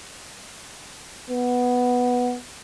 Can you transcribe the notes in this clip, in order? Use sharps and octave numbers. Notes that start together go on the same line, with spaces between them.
B3